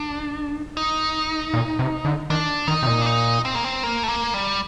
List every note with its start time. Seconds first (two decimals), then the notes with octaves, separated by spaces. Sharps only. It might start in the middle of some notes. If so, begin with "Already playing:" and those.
Already playing: D4
0.77 D#4
1.54 A#2
1.79 C3
2.05 D3
2.30 D#3 D4
2.68 D#3 D#4
2.83 C3
2.87 A#2
3.02 D4
3.06 D#4
3.45 C4
3.55 A#3
3.64 C4
3.83 A#3
4.03 A3
4.09 A#3
4.34 G3